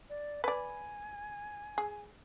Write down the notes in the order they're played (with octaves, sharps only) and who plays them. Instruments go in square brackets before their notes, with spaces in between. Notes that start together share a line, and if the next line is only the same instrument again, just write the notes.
[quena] D5
[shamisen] B4 D5 [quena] G#5
[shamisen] G#4